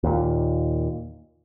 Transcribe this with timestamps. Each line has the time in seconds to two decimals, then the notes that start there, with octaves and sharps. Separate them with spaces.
0.04 D#2 A#2